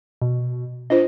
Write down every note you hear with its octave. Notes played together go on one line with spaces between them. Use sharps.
B2
D4 F4 C5 D#5